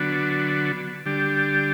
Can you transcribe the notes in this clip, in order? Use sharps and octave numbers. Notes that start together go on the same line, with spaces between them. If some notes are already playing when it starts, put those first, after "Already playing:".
Already playing: D3 F#3 B3 D4 F#4
D3 G3 D4 G4